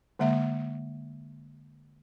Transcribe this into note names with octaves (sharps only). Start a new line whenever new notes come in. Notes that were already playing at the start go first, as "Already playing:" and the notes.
D3 G#3 A#3 E5